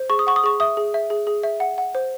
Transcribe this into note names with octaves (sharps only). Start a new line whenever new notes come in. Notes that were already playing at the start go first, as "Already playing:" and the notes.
Already playing: C5
G#4 C#6
D#6
F#5 C#6
D#6
G#4 C#6
E5 D#6
G#4
E5
G#4
G#4
E5
F#5
F#5
C5